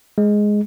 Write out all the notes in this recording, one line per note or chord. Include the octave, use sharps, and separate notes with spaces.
G#3